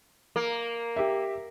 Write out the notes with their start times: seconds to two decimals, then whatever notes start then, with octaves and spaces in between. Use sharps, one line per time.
0.36 A#3
0.96 G4 E5